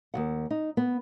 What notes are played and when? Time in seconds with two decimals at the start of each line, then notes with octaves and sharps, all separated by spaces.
0.14 D#2 G#2 F#5
0.51 D#4
0.77 B3